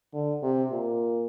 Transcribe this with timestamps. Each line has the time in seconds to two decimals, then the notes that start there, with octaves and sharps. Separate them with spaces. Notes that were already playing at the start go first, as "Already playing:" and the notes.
0.14 D3
0.43 C3
0.71 A#2